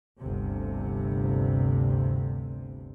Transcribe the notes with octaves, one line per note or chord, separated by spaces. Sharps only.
G1 D2 C3